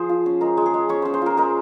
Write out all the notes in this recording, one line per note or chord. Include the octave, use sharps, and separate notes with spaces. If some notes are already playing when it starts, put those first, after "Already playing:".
Already playing: F3 G#4 C5
F4
C#4
G#3 A#4
G#3
G#4
G#3
C#4 C#5
C#4 C5
C5
F4 A#4
G#3 A#4